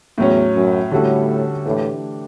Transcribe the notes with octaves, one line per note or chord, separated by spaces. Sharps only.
E2 A2 F#3 C#4
F#2
A2 D3 G3 C#4 F#4 A4
A2 E3 A3 D4 G4